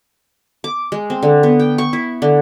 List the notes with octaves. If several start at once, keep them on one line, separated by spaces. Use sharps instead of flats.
D6
G#3
C4
D3
B3
G5
C#6
E4
D3